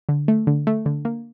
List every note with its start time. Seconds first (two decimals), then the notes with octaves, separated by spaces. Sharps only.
0.09 D3
0.28 A3
0.47 D3
0.67 A3
0.86 D3
1.05 A#3